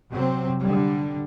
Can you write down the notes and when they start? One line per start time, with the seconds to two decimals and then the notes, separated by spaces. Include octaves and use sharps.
0.12 C3 F#3 C4
0.59 D3 G3